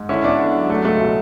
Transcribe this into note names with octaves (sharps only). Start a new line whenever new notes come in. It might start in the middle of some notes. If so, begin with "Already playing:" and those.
Already playing: G#2
D3 C#4 E4
D3 B3 D4
D3
F#3
F#3 A3
C#2 A3
B2